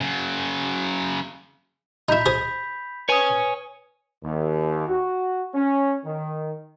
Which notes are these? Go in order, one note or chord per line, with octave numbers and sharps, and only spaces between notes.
C#3 F#3
D#4 E4 B5 G6 B6
G#4 C5
B4 C#5 G#5 D#6
D#2
F#4
C#4
D#3